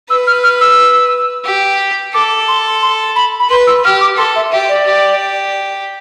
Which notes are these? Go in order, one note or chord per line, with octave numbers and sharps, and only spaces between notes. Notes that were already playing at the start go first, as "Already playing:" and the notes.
B4 E6
F6
F6
E6
G4
A4 D6
C6
C6
B5
B5
B4 C6
E6
G4 F6
D6
A4 C6
E5
G4 E5
D5
G4